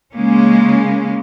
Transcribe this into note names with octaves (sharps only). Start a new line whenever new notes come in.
C#3 G#3 A#3 C#4